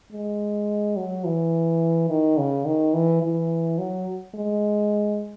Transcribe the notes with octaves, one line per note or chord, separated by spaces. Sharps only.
G#3
F#3
E3
D#3
C#3
D#3
E3
E3
F#3
G#3